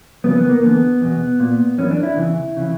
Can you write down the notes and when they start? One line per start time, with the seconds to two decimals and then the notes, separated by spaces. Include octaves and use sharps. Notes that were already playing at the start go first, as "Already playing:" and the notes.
0.24 F#2 C#3 E3 B3
0.37 B3
0.49 A#3
0.63 E2 D3 B3
1.01 E2 B2
1.40 A#2
1.78 F#2 E3 C#4
1.91 D4
2.03 E4
2.16 E2 C#3 E3
2.57 C#3 E3